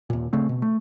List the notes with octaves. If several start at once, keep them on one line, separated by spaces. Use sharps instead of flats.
D#2 A#2
C#3 A3 C4
B2
A3